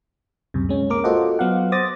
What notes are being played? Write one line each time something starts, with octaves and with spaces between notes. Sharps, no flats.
C#2 F#2 C3
G#3 C#4
A#3 A#4 D6
F4 F#4 A4 C5 D#5 F#5
F#3 B3 F5 F#5
C5 D6 D#6 A6 A#6